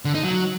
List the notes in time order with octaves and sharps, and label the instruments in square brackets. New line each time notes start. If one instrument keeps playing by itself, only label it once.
[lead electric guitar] D3
D#4
F#3